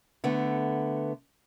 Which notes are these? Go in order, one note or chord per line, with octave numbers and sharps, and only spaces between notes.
D3 A3 B3